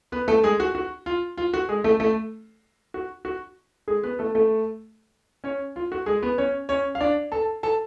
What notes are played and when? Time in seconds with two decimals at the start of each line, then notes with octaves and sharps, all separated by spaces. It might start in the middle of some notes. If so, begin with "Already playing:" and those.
0.12 B3 B4
0.28 A3 A4
0.43 G#3 G#4
0.60 F#4
0.75 F#4
1.06 F4
1.37 F4
1.54 F#4
1.69 G#3 G#4
1.84 A3 A4
2.00 A3 A4
2.94 F#4
3.25 F#4
3.88 G#3 G#4
4.03 B3 B4
4.19 A3 A4
4.35 A3 A4
5.44 C#4 C#5
5.76 F4
5.92 F#4
6.06 G#3 G#4
6.22 B3 B4
6.38 C#4 C#5
6.69 C#4 C#5
6.95 F5
7.01 D4 D5
7.32 A4 A5
7.63 A4 A5